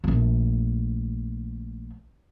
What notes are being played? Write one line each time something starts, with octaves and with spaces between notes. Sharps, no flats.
A#1 A3